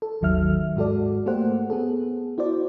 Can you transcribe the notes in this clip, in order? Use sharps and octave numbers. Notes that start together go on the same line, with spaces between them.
A4
G#1 D#2 D#3 F#3 E5 F6
G#2 G#3 F#4 A4 D5
A3 A#3 G4 A4 C5 F#5
B3 G#4 A4
E4 F#4 C5 D5